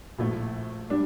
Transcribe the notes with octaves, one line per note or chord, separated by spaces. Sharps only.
A#1 A2 A3
G3 D4